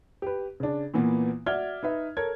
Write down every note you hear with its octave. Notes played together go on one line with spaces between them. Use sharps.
G4 B4
C#3 D4
A#2 E3 A#3 B3
F#4 D5 E5 F6 G#6 G7
D#4 B4 E5
A4 A#4 C#5 G#6